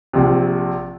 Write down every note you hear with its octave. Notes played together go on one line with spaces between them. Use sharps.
A#1 C3